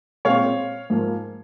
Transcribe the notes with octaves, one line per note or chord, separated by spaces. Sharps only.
A#2 G#3 C4 C#5 F5
G#2 F3 A#3